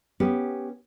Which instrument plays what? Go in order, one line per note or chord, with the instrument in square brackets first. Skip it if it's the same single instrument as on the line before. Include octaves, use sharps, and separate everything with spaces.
[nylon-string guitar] B3 C#4 G4